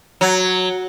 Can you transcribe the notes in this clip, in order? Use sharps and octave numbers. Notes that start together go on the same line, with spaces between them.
F#3